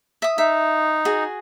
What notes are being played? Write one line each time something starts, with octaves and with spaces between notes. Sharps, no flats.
E5 D#6
D#4 E5
F#4 G#4